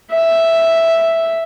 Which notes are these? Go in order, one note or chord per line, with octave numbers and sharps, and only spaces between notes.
E5